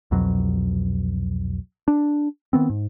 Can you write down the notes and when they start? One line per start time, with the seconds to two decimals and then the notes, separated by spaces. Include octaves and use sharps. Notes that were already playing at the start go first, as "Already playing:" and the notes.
0.11 C2 F2 B2 F#3
1.88 D4
2.53 D#3 B3 C4
2.69 G#2